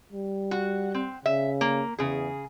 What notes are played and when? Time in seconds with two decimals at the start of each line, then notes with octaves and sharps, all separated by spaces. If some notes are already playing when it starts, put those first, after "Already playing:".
0.12 G3
0.51 F#4
0.94 C4
1.26 C#3 E5
1.61 A#3
1.99 E2 C#3 G#4